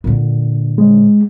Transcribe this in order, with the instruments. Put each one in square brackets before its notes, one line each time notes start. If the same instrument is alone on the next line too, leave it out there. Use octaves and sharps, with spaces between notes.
[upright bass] A#2 D3
[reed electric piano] G#3